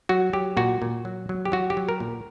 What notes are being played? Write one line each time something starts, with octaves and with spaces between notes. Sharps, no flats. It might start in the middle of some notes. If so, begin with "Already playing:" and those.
F#3 F#4
F#3 G4
A#2 F#4
A#2
F#3
F#3
G4
F#3 F#4
G4
F#3
A#4
A#2